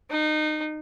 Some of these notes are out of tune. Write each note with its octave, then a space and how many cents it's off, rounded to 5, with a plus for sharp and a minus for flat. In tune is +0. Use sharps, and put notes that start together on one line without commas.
D#4 -25